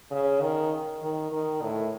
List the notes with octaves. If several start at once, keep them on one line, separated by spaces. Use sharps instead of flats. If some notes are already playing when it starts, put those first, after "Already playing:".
C#3
D#3
D#3
D#3
A2